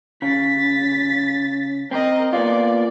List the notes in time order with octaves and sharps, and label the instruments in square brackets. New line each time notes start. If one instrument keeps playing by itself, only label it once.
[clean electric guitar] C#3 [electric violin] A6 B6
[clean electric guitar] C4 [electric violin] A#4 D#5
[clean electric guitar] A#3 B3 F4 [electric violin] D5